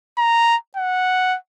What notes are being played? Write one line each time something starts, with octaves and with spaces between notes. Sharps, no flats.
A#5
F#5